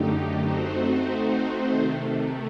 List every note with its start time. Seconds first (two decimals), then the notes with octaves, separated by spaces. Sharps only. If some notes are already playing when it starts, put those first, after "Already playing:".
Already playing: F#2 D3 A3 D#4 G4
0.42 A3 C4 D#4 F#4 C5
1.67 C3 D#3 A3